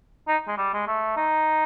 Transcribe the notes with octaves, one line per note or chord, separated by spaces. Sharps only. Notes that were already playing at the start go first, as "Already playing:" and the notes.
D#4
G#3
G3
G#3
A3
D#4